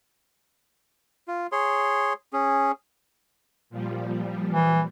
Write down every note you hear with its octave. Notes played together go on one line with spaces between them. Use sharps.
F4
G#4 C#5 C6
C#4 G#4
A#2 F3 G3
E3